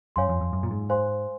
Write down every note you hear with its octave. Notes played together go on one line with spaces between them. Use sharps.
F#2 C#5 F5 G#5 C6
F2
F2
F#2
A#2
G#2
C5 F5 G#5 C6